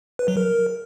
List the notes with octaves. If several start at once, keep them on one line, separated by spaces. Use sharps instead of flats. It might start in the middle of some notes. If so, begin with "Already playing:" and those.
B4
F#3
A#4